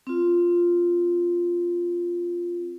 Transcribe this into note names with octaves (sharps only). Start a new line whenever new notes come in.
C4 F4